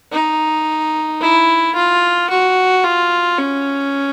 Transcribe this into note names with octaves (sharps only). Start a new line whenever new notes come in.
D#4
E4
F4
F#4
F4
C#4